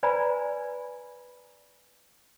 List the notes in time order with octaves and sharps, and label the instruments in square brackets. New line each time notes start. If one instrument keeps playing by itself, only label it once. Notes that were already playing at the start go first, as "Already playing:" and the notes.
[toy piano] B4 C5 D5 G#5 A#5 B5